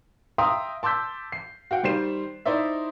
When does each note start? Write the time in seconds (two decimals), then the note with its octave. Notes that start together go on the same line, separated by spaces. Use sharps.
0.38 E5 F5 G5 A#5 C6 D#6
0.83 A5 C6 D6 E6 G6 B6
1.32 C7
1.71 F#4 F5 G5
1.83 D#3 G3 C5 C7 E7
2.45 D#4 E4 C5 D5 E5